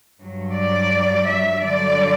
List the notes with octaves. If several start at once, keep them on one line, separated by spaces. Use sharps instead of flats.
G2 F#3
D5
E5
G2 D3 F#3 D5